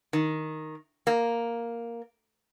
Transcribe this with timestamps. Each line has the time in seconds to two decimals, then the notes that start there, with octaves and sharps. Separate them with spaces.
0.13 D#3
1.07 A#3